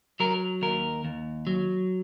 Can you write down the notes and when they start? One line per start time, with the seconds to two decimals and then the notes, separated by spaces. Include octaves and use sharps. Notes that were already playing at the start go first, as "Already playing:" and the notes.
0.20 F#3 A#4
0.62 D#2 A#4
1.05 D#2
1.47 F#3